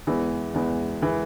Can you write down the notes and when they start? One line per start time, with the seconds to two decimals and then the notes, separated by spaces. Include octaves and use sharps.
0.07 E2 E3 G#3
0.54 E2 E3 G#3
1.02 E3 G#3